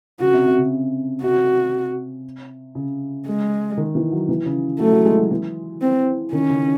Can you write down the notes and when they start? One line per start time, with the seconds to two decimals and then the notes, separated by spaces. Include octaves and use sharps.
0.20 C#3 F#4
0.33 C3
0.46 C3
0.58 C#3
1.23 C3 F#4
2.75 C#3
3.27 G#3
3.77 D#3
3.95 E3
4.12 F#3
4.29 E3
4.46 C#3
4.79 F#3 A3
4.92 F#3
5.05 G#3
5.18 F#3
5.31 E3
5.82 C4
6.32 D#3 C#4
6.50 C#3